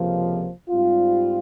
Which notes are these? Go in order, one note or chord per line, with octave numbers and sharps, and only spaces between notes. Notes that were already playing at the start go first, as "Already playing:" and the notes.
Already playing: C#2 C3 F3 A#3
G#2 G3 C4 F4